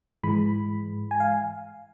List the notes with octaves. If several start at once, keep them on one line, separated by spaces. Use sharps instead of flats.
G#2 E3 G#3 B5
G#5
F5